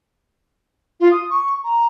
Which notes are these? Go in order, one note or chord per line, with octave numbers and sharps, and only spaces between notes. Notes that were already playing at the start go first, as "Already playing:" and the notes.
F4
D#6
C#6
A#5